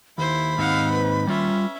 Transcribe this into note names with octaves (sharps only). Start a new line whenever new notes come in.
D#2 E4 C5 B5
G#2 C4 D#4 F5 F#5
B4
G3 C#4 F4 E5